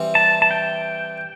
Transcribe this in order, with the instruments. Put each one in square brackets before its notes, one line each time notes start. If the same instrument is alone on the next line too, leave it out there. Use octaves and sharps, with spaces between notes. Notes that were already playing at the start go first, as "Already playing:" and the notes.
Already playing: [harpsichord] E3 G3 C4
[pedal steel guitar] A5
A5
G5